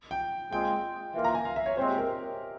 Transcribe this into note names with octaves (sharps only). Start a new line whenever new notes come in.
G5
A#2 G#3 C4 F4 G#4 G5
E3 A#3 F4
A#5
G#5
F5
E5
C#5
A#2 G#3 C4 C5
G4
A#4